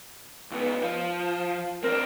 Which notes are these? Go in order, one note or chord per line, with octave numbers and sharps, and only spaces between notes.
C#2 B3
F3
C4 D4 A#4